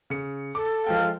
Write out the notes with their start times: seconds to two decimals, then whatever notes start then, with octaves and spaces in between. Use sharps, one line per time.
0.10 C#3 C#7
0.55 A4 D6
0.87 F3 G#3 F5 G5